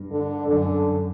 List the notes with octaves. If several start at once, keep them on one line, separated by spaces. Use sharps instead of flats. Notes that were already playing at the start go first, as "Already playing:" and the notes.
Already playing: G2
D3
F#2 D3